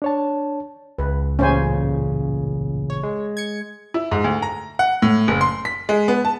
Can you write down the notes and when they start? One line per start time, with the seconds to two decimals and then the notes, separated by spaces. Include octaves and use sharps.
0.02 D4 C#5 A5
0.98 C#2 B4
1.39 A1 A#2 C#3 C#4 C5 G#5
2.90 C#5
3.03 G#3
3.37 G#6 C#7
3.94 E4
4.11 G#2
4.24 D2
4.42 A#5
4.79 F#5
5.02 A2
5.28 F#1
5.41 C6
5.65 B6
5.89 G#3
6.08 B3
6.25 A5